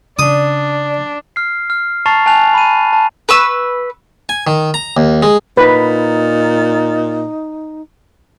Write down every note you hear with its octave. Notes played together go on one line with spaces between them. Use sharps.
C#3 D4 D5 D#6
F6 C7
F6
A5 A#5 C#6 A6 C7 F7
G#5 A5 F#6 F7
B5 D#7
A5
B4 C#6 E6
G#5
D#3
A#5
D#2
G#3
A#2 D#4 B4